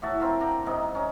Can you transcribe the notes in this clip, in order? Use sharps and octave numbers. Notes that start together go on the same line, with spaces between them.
A2 F#4 E5 A5
C4 F4 A#4 E5
D4 F#5 G5 A#5
G#2 C3 D#3 D#4
C#4 D#4